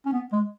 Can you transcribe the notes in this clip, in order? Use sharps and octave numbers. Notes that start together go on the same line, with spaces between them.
C#4
B3
G#3